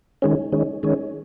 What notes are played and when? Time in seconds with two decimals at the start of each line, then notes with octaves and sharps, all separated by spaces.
0.22 D#3 G#3 C#4
0.52 D#3 G#3 C#4
0.83 D#3 G#3 C#4